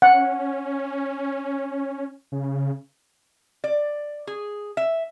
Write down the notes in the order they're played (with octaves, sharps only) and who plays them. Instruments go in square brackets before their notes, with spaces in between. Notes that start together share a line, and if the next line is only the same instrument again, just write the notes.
[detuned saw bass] C#4 [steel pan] F#5
[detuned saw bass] C#3
[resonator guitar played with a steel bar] D5
G#4
E5